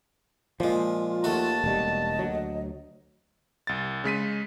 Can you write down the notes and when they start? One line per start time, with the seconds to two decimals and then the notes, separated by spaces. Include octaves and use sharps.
0.60 A#2 F3 G#3 F4
1.24 D#2 A3 F#4 A5
1.64 E1 G3 D#5
2.19 D2 F#3
3.67 C2 A6
4.04 C#3 G#3 B6 D#7